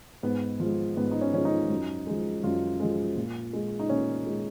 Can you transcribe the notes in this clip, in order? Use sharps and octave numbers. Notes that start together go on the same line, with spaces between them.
G#2 B3
F3 G#3
G#2 B3
D#4
C#4
F3 G#3 C#4
D#4
F#2
F3 G#3
F#2 F4
F3 G#3
A#2
G#3
D#4
A#2 C#4
G#3